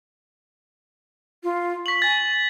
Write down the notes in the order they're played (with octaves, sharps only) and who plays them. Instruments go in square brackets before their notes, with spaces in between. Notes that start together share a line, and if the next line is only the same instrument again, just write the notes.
[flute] F4
[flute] C#6 [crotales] B6 F#7
[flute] G#5 [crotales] A6